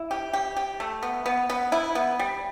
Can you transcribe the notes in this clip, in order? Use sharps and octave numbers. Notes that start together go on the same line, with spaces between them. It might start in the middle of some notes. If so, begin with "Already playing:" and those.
Already playing: E4
G4
G4
G4
A3
B3
B3
B3
E4
B3
G3